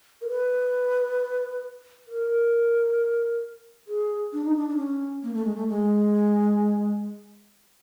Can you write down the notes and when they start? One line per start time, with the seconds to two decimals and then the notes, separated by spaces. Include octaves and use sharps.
0.22 A#4
0.29 B4
2.08 A#4
3.88 G#4
4.33 D4
4.45 D#4
4.57 D4
4.69 D4
4.77 C#4
5.23 A#3
5.34 A3
5.45 G#3
5.55 A3
5.68 G#3